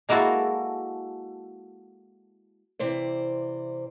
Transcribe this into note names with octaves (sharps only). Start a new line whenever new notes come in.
G#3 A#3 E4 F#4 A4
C3 E3 C5 D5